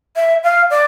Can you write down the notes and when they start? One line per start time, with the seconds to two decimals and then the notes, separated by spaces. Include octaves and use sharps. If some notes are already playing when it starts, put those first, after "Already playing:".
0.16 E5
0.43 F5
0.70 D5